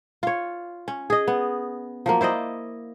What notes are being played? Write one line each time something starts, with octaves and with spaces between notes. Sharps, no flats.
F4 C#5
C#4
G#4 D#5
B3
F3 F#3 A#3
E4 C5 D5 D#5